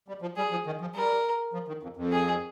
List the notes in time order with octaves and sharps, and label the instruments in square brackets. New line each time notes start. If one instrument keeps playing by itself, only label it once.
[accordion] G3
F3
[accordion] G3 [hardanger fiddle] G#4
[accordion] F3
D#3
F3
[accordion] G3 [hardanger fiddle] A#4
[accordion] F3
D#3
F2
F2
[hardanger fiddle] G#4